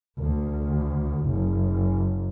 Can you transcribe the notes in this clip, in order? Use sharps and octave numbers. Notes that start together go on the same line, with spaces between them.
D2
F#1